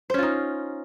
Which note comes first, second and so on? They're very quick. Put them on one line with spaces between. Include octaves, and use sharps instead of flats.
C5 C#4 F4 D#4